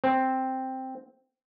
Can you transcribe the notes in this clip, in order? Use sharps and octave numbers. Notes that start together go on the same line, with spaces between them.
C4